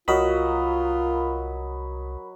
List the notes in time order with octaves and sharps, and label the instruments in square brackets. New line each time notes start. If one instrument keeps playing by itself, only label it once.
[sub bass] C2 [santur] F#3 D#5 [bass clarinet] F4 [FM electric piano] A#4 B5